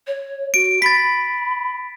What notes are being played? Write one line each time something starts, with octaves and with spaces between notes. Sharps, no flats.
C#5
F#4 D7
B5 A6 B6